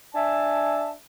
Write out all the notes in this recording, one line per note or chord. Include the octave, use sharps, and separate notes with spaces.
D4 E5 G#5 A5